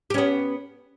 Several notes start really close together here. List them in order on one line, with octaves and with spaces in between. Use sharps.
G4 C#4 B3